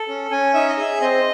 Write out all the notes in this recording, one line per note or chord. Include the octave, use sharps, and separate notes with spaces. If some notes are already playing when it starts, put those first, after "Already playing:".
Already playing: A4
C#4
C#4 G#5
D#4 E5
D#5
G#4 E5
C4 D#5